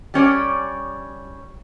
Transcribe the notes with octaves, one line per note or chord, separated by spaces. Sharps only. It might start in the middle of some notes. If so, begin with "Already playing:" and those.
G3 C#4 C#5 D5